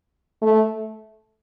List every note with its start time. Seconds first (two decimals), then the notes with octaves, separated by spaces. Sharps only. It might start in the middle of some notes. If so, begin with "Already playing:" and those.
0.42 A3